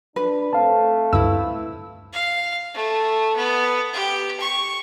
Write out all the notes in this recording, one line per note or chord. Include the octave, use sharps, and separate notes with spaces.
D4 B4
A3 C4 F5 A5
D2 G2 E4 B4 E6
F5
A3
B3
G4
C#6